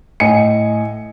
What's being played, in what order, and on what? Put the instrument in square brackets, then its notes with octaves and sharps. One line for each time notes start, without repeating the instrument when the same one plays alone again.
[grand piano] A2 D#5 G#5 C#7